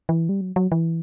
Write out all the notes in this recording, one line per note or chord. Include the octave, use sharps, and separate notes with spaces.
E3
G3
F#3
F#3
E3